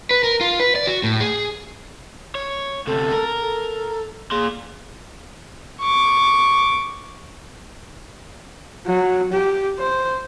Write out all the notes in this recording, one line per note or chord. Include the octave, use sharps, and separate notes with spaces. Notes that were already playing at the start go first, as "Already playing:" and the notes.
B4
A#4
F4
B4
D5
F#4
A2
G#4
C#5
D2 C3 A4
A#4
A4
A#3 G#4 C6
C#6 D6
F#3
G4
C5